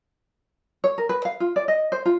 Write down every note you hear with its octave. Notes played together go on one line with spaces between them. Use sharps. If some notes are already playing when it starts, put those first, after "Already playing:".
C#5
A#4
B4
F5
F4
D5
D#5
C5
F4